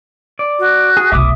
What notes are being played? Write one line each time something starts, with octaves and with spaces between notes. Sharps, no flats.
D5
F#4
G#4
F1 B1 E5 D6 D#6